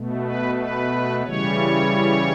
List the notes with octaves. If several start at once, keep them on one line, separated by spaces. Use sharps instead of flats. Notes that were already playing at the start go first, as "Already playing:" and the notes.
Already playing: B2 A3
B4
B4
C#3 E3 G3 C#5